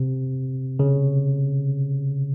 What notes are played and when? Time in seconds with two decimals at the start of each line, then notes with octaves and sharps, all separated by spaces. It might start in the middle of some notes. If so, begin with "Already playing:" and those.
Already playing: C3
0.79 C#3